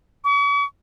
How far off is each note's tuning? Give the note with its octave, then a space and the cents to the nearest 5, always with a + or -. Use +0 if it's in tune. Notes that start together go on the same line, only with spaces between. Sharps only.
C#6 +45